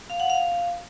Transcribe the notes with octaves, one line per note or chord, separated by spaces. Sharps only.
F5
F#5
F5